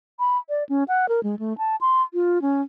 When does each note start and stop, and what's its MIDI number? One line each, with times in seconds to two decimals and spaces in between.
0.20 0.38 83
0.49 0.64 74
0.69 0.84 61
0.88 1.09 78
1.09 1.20 70
1.23 1.35 56
1.39 1.56 57
1.58 1.76 81
1.81 2.02 84
2.14 2.41 65
2.42 2.61 61